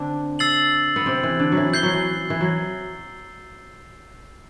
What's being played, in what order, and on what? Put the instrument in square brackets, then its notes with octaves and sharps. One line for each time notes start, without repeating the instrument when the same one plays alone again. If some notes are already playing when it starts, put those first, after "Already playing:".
Already playing: [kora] D3 C4 D4
[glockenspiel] E6 A6 C7 F#7
[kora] B3
C3 C4
E3
D3
F#3
E3
[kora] E3 [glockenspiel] G6 C7 G7
[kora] F#3
E3
E3
F#3